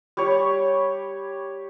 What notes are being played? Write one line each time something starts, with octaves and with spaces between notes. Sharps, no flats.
G3 C#5